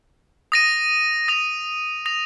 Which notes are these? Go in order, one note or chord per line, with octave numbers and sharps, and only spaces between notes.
D#6 A#6 D#7
D#6 A#6 F7
D#6 A#6 F7